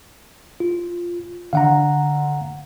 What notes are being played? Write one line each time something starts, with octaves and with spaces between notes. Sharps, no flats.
F4
D3 F5 F#5 A#5